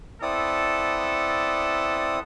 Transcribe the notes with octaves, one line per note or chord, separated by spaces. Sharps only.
B3 C4 E4 A4 D5 D#6